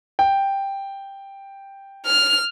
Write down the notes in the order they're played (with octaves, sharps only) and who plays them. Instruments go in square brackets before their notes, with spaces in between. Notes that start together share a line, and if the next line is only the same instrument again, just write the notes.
[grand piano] G5
[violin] F6